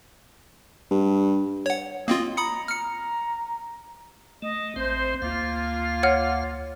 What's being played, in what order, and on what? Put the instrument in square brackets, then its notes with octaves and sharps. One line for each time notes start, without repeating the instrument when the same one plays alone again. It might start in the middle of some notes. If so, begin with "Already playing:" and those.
[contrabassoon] G2
[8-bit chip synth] C#5 F#5
[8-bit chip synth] A#3 C4 F4 [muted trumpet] D#5
[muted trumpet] A#5 [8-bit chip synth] B5 D#6 C#7
[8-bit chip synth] F6 C#7
[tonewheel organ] A3 [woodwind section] D#5
[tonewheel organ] A1 C4 [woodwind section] C5
[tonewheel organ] D2 F5 [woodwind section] A#3 F4
[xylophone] C#5 F#5 F6